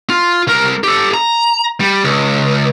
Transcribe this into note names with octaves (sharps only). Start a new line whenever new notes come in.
F4
C2 A#4
G4 A4
A#5
G3
C#2